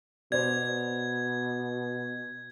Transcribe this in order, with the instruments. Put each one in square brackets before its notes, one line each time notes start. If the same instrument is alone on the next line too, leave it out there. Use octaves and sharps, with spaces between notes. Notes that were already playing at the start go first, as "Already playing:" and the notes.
[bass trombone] B2 [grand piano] C5 D5 [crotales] G#6